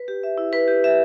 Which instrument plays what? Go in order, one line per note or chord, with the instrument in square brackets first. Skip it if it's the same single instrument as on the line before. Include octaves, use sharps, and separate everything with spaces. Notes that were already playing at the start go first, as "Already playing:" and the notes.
Already playing: [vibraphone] B4
G4
E5
E4
B4
G4
E5